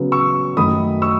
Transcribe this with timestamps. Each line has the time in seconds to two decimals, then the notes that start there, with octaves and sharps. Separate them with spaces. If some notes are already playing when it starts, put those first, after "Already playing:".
Already playing: C#3 F#3 B3
0.12 C#6 E6
0.57 F#2 D#3 F#3 A3 B5 D#6
1.02 C#6 E6